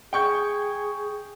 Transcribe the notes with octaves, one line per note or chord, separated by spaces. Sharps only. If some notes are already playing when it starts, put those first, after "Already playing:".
G#4 G5 C#6 G6